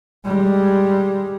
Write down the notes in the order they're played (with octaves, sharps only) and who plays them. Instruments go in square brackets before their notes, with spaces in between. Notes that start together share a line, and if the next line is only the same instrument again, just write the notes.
[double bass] G3 G#3